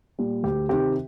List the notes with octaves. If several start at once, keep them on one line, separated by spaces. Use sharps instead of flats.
A#2 G3
D2 G4
C3 D#3 G4